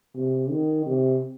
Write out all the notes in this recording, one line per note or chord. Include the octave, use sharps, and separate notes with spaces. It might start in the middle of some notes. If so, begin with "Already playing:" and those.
C3
D#3
C3